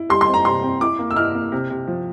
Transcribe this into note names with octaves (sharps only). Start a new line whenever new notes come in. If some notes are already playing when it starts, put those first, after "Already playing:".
Already playing: E4
G3 C6
C6
C4
A#5
C3 C6
C4
E4 D6
A#3
E6
E4 F6
A#3
C3
C3
F3